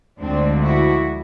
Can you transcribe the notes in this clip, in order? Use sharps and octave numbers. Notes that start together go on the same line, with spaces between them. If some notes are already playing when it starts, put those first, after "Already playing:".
D2 D3 F3 G#3 C4 D4
E4 F#4